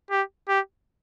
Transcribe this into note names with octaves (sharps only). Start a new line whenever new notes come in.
G4
G4